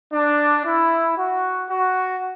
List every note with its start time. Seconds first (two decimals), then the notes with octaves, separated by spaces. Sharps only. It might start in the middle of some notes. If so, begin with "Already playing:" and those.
0.12 D4
0.65 E4
1.17 F#4
1.69 F#4